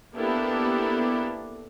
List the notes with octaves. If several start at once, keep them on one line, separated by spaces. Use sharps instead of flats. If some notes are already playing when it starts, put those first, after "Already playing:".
A#3 B3 D4 E4 G4 A4